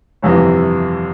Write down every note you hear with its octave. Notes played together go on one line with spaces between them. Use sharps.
G1 F2 C3 E3